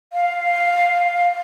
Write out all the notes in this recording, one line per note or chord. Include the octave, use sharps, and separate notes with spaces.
F5